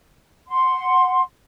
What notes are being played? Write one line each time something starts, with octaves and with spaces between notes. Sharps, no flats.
F#5 C6